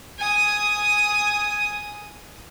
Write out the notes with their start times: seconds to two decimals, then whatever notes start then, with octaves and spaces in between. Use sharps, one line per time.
0.19 G#5 D#6